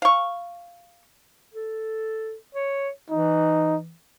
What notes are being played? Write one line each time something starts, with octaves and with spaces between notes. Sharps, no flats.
F5 C#6
A4
C#5
E3 D#4